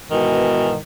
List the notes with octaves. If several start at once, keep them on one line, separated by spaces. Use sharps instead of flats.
G#2 B2 D#3 E3